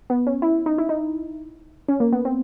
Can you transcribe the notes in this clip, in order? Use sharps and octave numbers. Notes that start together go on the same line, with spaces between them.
B3
C#4
E4
D#4
E4
D#4
C#4
A#3
B3
C4